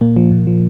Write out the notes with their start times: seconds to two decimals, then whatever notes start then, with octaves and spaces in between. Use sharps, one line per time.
0.01 A#2 A#3
0.16 F3
0.32 A#2
0.47 F3